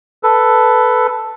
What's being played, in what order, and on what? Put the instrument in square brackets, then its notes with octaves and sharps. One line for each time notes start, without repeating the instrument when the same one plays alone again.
[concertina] A4 B4